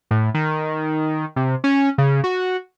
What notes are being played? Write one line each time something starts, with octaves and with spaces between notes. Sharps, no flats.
A2
D#3
C3
C#4
C#3
F#4